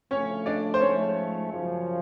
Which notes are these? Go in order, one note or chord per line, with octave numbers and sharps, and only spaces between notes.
D2 C#3 F3 A3 C#4 C#5
D4 D5
C5
G#2 F3 A3 C#4 C#5
F#2 C#3 F3